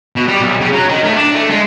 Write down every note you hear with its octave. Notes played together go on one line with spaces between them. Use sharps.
B2
G3
B1
C#3
F#3
D#3
A3
D4
A3
G#3